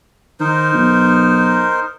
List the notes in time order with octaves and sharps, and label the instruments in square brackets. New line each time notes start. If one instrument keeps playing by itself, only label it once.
[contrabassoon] D#3 [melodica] D#4 A#4 C5
[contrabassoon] B1